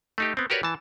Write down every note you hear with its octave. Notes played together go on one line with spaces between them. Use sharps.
A3 D#4 G4
B3 C4
F#4 G4 A#4 B4 C#5 D5
E3 A5